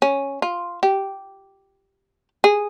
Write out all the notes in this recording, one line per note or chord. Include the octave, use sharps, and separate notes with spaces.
C#4
F4
G4
G#4